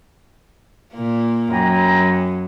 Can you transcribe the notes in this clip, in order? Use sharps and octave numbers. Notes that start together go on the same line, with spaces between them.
A#2 A#3
F#2 G5 G#5 A#5